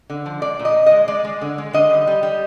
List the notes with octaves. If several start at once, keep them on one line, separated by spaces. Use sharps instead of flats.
D3
F3
G#3 D5
A#2
D#5
A#2
G#3 D#5
G#3 D5
G#3
D3
G#3
D3 D#5
G3
G3
G3